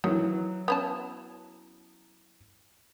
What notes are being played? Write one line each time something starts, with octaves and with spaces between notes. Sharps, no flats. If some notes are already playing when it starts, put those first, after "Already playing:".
D#3 E3 F#3
B3 C#4 A5